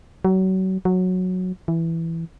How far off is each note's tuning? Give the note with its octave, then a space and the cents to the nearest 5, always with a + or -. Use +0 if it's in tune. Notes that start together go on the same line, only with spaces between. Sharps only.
F#3 +30
F#3 -10
E3 +5